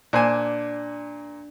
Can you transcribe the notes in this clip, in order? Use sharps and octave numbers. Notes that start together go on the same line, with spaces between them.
A#2 D4 C5 G#5